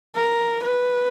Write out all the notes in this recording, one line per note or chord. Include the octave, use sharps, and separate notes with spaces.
A#4
B4